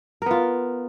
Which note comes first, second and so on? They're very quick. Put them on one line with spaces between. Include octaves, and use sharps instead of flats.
A#4 B3 F4